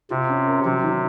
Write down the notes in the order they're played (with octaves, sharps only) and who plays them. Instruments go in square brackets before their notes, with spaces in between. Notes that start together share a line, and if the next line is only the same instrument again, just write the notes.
[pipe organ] C3 [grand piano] F4
[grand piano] C#4
A#4
[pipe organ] C3 [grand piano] F#3
[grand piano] D#3